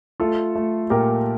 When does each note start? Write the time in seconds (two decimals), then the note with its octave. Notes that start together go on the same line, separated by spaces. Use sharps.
0.20 A3 F4 A4
0.55 A3
0.90 A#2 G4 A#4